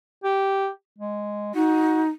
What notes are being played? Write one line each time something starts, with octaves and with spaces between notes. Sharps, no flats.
G4
G#3
D#4 F#4